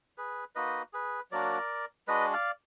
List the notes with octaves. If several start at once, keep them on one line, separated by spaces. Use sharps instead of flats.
G#4 B4
A#3 D#4 F#4 B4 D#5
G#4 B4
F#3 A#3 D4 F#4 A#4 D5
G#3 D4 F#4 B4 D#5
D5 F5